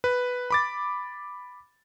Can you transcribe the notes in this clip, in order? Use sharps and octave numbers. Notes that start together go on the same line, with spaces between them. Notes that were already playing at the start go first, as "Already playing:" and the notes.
B4
B5 D6 A6